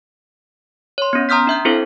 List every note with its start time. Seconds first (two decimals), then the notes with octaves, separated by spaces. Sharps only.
0.98 C#5 C6
1.13 B3 C#4
1.29 A#5 C6 D#6 F6 G6 B6
1.47 D4 E5 G6
1.65 C4 D4 E4 A4 C5